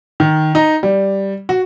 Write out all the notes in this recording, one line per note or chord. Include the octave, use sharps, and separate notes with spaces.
D#3
D#4
G3
F#4